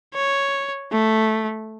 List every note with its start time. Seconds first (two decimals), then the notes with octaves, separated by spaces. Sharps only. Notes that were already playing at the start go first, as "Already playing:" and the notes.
0.14 C#5
0.92 A3